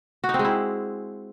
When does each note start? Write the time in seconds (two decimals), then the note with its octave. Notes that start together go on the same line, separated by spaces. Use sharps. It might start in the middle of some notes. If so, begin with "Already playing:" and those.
0.24 F#4
0.29 D#4
0.34 C4
0.39 G#3
0.45 E4